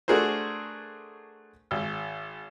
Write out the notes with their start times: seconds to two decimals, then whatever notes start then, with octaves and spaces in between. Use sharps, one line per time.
0.08 A3 D4 F#4 G#4 A#4 C5
1.71 G#1